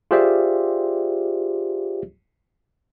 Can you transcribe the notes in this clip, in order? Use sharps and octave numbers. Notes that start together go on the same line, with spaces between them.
F4 G4 G#4 C5 D5 E5